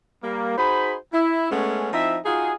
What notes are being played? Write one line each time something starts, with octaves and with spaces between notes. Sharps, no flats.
G3 A#3
D#4 F#4 G#4 C5 B5
E4
G#3 A3 B3 C#4
F3 C4 D#4 E4 E5
D#4 F4 F#4 G#4